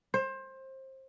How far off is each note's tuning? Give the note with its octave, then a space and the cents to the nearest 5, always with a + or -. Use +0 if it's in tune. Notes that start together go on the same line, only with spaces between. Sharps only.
C5 +25